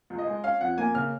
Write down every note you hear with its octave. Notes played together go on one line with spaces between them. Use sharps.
C#2
D#5
G#3
C#4 F5
F2 F#5
A#3 G#5
C#3 F6